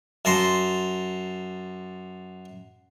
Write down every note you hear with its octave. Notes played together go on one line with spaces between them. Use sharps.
F#2 A5 A#5 C6